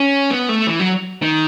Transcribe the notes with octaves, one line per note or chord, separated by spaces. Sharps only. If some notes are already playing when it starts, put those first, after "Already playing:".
Already playing: C#4
B3
A3
E3
F#3
D#3